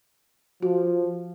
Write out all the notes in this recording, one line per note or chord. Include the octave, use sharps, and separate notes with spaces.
F3 F#4